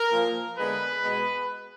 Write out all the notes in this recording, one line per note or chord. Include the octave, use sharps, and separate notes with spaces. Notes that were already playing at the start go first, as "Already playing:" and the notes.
Already playing: A#4
A#2 F3 A#3
D3 G#3 B3 B4
B2 G#3 B3